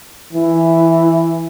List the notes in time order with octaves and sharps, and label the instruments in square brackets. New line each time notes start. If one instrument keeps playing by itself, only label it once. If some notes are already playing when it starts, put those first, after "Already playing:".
[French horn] E3